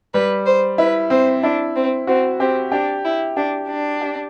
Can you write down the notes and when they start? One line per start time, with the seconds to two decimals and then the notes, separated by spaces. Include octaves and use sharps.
0.14 G3 B4
0.46 C5
0.78 E4 B4
1.10 C4 C5
1.43 D4 E4
1.76 C4
2.07 C4 F#4
2.40 C4 G4
2.72 D4 G4
3.05 E4
3.37 D4 G4
3.68 D4
4.01 G4